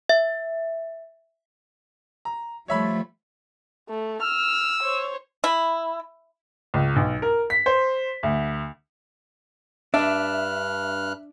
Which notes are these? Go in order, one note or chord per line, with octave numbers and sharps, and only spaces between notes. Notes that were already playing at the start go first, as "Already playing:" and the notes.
E5
A#5
F3 G3 A3 C#5 E5 B5
A3
E6 F6
C5 C#5
E4
C#2
B1
A#4
B6
C5
D2
G2 D4 E5 F6 F#6